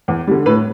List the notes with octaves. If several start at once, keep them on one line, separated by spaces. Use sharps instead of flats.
E2
D3 G3
A2 B4